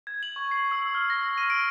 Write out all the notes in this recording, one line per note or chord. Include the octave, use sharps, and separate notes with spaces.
G#6
F#7
C#6
C7
E6
F6
A#6
D#7
D7